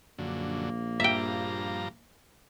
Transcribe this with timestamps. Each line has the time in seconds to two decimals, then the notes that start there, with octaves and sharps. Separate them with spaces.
0.18 A#1 F#2 D3 A#3
1.00 G2 F3 E5 G5 A#5